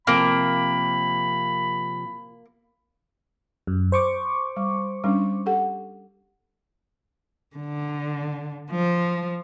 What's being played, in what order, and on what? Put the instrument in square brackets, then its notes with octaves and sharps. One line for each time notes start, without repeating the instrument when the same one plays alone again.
[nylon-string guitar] C3 F3 [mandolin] A#3 [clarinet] B5
[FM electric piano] F#2
C5 C#6 D6
[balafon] G3
G3 C#4 D4
G4 A4 F#5
[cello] D3
F3